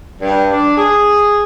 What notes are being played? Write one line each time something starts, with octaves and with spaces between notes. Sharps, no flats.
G2
D4
G#4